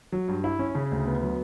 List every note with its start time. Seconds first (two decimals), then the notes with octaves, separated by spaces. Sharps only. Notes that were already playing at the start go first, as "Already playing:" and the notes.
0.12 F#3
0.28 G2
0.44 E4
0.59 C#4
0.75 C#3
0.92 D2
1.07 B3
1.22 F#3